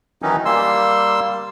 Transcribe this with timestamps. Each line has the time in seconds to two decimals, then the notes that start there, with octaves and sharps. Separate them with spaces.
0.22 D#3 E3 F#3 C#4 D#4
0.45 G3 A#3 C6 E6